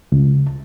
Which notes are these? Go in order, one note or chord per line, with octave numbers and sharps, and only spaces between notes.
C#2